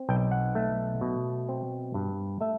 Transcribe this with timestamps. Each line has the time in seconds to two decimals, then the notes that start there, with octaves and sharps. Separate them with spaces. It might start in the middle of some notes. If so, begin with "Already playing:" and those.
Already playing: C4
0.09 B1 G5
0.32 F#5
0.55 A3
1.01 B2
1.49 C4
1.94 G2
2.41 A3 E5